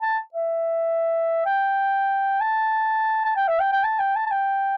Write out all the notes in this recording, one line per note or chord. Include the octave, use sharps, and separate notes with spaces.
A5
E5
G5
A5
A5
G5
E5
G5
G5
A5
G5
A5
A5
G5